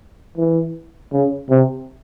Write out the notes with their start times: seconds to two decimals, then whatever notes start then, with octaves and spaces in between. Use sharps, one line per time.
0.38 E3
1.13 C#3
1.50 C3